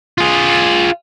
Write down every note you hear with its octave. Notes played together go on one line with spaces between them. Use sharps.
F4 G#4